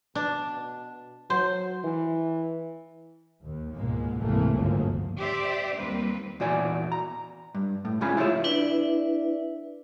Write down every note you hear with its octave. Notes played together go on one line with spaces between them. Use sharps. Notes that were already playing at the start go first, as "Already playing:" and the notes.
B2 D4
F#3 C5
E3
D#2
C#2 G#2 B2 G#3 A#3
G#1 C#2 C3 E3 A3 A#3
G1 D2 G#2 C#3 F3 A#3
G4 C5 D5 E5
D#2 G3 A#3 C4 B4
E2 A#2 F#4 D5 G#5
A#5
G2
A2
F2 G#2 C#3 F4 G#4 B5
E4 F4 G4 C#5 E5
D4 E4 B4 D5 E5